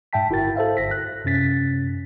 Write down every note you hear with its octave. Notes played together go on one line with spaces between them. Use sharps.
G#2 E5 G5 A5 B6
G1 E4 F#4 A#4 A6
A4 C5 E5 F5
G1 A#6 B6
F#6
F#2 C3 C#4 A6 B6